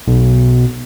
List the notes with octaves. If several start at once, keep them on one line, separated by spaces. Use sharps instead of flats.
B1